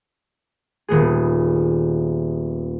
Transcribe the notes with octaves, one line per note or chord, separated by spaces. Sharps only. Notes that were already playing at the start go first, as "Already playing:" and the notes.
D#1 B3 G#4